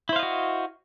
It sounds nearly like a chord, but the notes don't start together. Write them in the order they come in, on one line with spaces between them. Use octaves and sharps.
E4 C5 F5 D#5 F#4